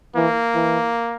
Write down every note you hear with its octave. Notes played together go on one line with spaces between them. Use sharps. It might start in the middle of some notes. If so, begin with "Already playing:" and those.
E3 A#3
E3